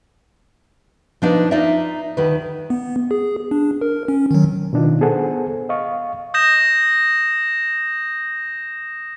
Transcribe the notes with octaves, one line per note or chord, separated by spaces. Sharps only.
F3 D4 D#4 B4
D#4 F4 D5 E5
D2 D#3 B4
B3
G#4
D4
A#4
C#4
D#3 F#3
B2 D#3 D4 D#4 F4
B3 G#4 A4 C5 F#5
D#5 F5 C#6
D#6 G6 A#6 E7